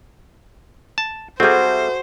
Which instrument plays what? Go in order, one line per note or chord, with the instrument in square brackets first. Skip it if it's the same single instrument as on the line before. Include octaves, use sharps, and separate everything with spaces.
[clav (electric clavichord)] A5
[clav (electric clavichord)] G3 C4 [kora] F#4 G#4 [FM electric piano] A4 E5 A5 [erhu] C5